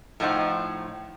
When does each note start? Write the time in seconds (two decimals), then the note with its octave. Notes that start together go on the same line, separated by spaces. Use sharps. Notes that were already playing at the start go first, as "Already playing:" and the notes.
0.20 A2 F3 D#4 C5 F#5